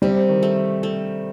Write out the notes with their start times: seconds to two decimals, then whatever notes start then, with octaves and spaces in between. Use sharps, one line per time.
0.02 C3 G3
0.29 D#3
0.43 A3
0.83 A3